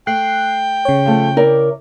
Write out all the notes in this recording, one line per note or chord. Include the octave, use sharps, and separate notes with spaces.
A3 G5 F#6 C7
C#3 C#5
F3 A3
E4 A#4 D5